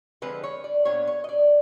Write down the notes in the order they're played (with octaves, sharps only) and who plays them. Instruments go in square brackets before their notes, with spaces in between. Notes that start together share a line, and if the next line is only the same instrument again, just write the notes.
[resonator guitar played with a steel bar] D3 F3 G#3 C4 B4
C#5
D5
A#2 G3 B3 D4 C#5
C#5
D#5
D5